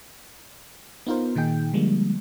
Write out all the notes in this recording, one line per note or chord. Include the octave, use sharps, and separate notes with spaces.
B3 D#4 F4 A#4 C5
A#2 D#3 D#4 G#4 G5
D3 F3 G3 G#3 A#3